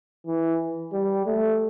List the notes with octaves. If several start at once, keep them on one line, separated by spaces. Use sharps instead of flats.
E3
G3
A3